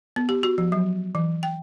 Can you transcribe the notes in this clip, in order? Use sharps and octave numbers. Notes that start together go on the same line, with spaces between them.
B3
G4
F#4
F3
F#3
E3
G5